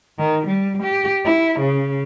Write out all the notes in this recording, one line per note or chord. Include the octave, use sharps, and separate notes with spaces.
D#3
G3
G4
E4
C#3